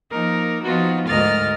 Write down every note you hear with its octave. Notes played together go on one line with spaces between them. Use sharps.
F3 A#3 D#4 A#4
F3 B3 D#4 F4 F#4
D2 G#2 A#4 D#5 F6 A6